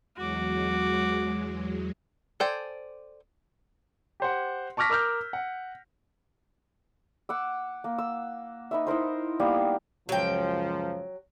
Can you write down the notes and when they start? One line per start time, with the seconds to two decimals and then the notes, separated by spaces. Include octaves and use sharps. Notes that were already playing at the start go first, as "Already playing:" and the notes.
0.17 E2 F#3 G#3 F#4 D6
2.40 A4 C5 D5 G5 G#5
4.20 G4 C5 F#5
4.77 A5 C#6 D6 F6 A#6 B6
4.90 A#4 D6 E6 F6 G6
5.33 F#5
7.29 F#5 D6 E6
7.84 A#3
7.98 E6
8.71 D#4 B4 E5
8.87 D#4 E4 A#4 C5
9.40 G3 A#3 B3 F5
10.09 C#2 F#2 F3 F#3 G5